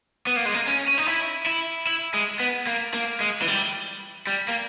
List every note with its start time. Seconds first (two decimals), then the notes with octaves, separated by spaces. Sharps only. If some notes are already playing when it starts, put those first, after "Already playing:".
0.27 B3
0.36 A#3
0.45 G#3
0.55 A#3
0.67 C#4
0.88 C#4
0.98 D#4
1.07 E4
1.46 E4
1.87 E4
2.14 G#3
2.40 B3
2.67 A#3
2.94 A#3
3.20 G#3
3.42 E3
3.48 G3
4.27 G3
4.48 A#3